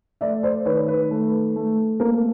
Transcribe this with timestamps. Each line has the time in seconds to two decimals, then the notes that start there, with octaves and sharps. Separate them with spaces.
0.21 A3 D5 E5
0.43 C5 D5
0.66 D#3 B4 C#5
0.88 B4
1.11 A3
1.56 A3
2.00 A#3 A#4